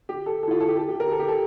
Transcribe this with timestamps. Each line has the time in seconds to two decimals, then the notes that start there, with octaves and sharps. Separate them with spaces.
0.09 G4
0.26 A4
0.43 A4
0.48 E4
0.51 F4
0.61 A4
0.68 G4
0.77 A4
0.88 G4
1.00 A#4
1.11 A4
1.20 G4
1.28 A4